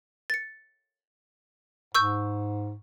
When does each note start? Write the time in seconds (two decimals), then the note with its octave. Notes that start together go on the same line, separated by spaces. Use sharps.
0.30 A6 C#7
1.95 G#2 C#6 E6 G6